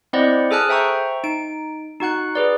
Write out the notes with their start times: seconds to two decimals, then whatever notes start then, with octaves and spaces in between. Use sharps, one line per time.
0.13 C4 E4 C5 D5 D#5 F#5
0.51 G#4 A4 G#5 A5 F6 F#6
0.69 C5 E5 G5 A#5 C#6
1.24 D#4 D7
2.00 D#4 F#4 F#5 F#6
2.35 G#4 B4 D5